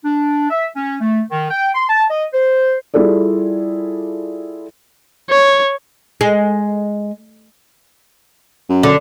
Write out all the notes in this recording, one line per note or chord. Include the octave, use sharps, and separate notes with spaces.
D4
E5
C#4
A3
D#3
G5
C6
A5
D#5
C5
G3 E4 F4 G#4 A4 D5
C#5
G#3
F#2
D3